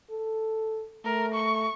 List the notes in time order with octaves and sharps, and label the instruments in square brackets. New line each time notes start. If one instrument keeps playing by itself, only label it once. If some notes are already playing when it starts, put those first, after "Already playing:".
[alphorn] A4
[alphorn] A3 [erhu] A#4
[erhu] C#6